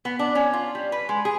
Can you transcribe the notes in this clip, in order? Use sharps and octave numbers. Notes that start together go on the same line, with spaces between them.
B3
D4
C#4
F4
G3
B4
G#3
G#4